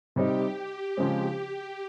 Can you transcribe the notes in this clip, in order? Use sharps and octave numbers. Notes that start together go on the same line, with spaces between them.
C3 G3 C4 D#4 G4
G4
C#3 F3 G#3 C4